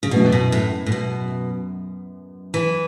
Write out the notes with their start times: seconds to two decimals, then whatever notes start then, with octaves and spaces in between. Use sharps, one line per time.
0.03 C#3
0.11 F#2 B2 E3 B3
0.32 B2
0.52 A2
0.86 A2
0.92 B2
2.54 E3